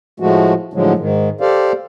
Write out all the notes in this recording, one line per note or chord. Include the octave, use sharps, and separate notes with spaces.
A2 F3 G#3 A3 F#4
A2 D3 F3 F#3 G#3
G#2 D#3
G4 A4 C5 D5 F5